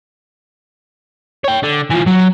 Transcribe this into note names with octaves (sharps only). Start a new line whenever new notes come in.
C#5 G5
D3
E3 F4
F#3